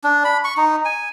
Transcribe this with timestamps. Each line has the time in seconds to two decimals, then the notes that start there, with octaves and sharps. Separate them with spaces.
0.04 D4
0.25 B5
0.44 C#6
0.57 D#4
0.85 G#5